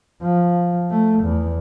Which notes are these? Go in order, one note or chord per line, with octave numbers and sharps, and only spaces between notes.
F3
A3
E2